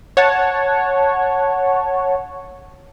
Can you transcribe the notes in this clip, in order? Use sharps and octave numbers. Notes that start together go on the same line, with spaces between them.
C#5 F#5 A5